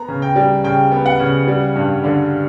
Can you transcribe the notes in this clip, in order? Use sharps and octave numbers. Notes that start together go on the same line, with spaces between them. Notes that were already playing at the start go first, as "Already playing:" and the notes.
Already playing: B3 A#5
C#3
G5
G3
C#3 G5
B3
F#5
C#3
G3
G2
D3